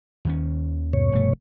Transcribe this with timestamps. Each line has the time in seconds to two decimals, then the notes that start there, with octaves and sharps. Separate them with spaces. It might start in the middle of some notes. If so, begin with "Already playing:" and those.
0.25 D#2 D#3 C#4
0.93 G2 B2 C#5
1.12 F1 A3